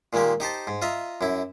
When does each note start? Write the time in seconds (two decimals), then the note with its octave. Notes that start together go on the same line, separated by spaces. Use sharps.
0.13 A#2 D#3 G#3 A#3 G4
0.40 D#4 G4 C5 A5
0.67 G#2
0.82 F4 D#5 E5 A#5
1.21 F#2 E4